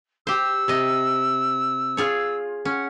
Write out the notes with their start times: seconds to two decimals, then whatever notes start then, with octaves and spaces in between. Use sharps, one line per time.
0.27 G4 C5 E6
0.68 C3 D#5
1.97 F4 G#4 C#5
2.65 C#4 F#5